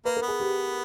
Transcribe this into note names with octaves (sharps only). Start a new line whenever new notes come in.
A#3 B4
A#4
B3
G#4
G4